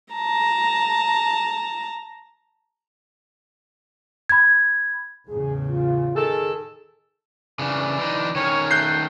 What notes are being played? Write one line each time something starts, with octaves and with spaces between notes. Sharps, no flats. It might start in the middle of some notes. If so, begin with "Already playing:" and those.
A5 A#5
B5 G#6
E2 A2 C#3 G#4
F4
D#3 G#4 A4
C#3 E3 D4
E3 D#4
D#3 C#4 C#5
A3 F#6 G6 C7